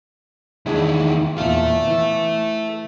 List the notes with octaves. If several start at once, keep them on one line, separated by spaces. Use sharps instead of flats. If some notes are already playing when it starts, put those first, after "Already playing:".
E2 D#3 G#3 D4 E4
E2 A#2 A4 E5 F5
E3